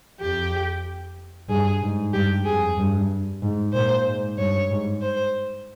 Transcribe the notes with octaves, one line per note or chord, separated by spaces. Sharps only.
F2 G4
G2 G#4
G#2
G2 G4
F2 G#4
G2
G#2
A#2 C5
G#2
G2 C#5
G#2
C5